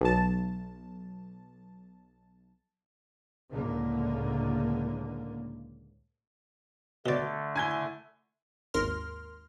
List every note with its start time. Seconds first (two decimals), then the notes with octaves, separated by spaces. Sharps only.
0.01 B1 A5
3.49 C#2 A2 D3 A#3
7.06 B2 D3 A3 D5
7.56 E4 G#5 G#6 G7
8.74 G#1 D#2 A#4 C6 F6